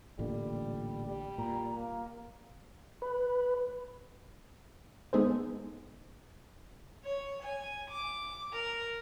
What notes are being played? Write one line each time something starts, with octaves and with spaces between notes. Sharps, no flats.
A1 A#2 D3 G3
G3
A#2 A#5
A#3
B4
G#3 B3 D#4 G#4 A4 C5
C#5
G#5
D6
A#4